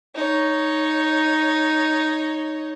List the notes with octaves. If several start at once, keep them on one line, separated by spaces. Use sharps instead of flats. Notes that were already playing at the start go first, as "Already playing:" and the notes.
D#4 C#5